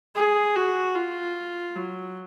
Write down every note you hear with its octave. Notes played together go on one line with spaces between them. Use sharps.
G#4
F#4
F4
F#3